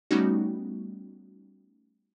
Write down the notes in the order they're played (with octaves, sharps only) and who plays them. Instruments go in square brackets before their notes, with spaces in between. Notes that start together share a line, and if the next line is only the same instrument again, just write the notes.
[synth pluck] G3 A3 B3 C#4 D#4 F#4